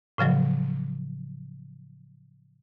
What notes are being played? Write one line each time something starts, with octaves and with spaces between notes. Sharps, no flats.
A2 C#3 F3 F#3